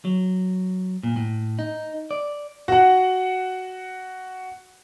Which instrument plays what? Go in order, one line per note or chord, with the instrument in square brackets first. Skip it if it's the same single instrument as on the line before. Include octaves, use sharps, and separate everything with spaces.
[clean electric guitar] F#3
A#2
A2
D#4
D5
[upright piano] F#4 F#5